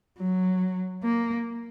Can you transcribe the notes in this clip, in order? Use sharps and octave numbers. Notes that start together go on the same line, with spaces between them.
F#3
A#3